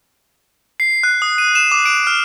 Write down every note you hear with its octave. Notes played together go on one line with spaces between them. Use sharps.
C7
F#6
D#6
D#7
E7
D6
D7
F6